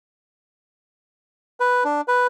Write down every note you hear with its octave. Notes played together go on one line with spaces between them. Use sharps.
B4
D4
B4